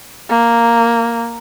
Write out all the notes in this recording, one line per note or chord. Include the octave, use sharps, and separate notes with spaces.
A#3